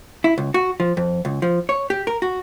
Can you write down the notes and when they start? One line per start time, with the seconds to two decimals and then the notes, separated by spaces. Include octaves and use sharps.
0.24 E4
0.38 C#2
0.54 F#4
0.80 F3
0.97 F2
1.25 C#2
1.42 F3
1.69 C#5
1.90 G4
2.07 A#4
2.22 F#4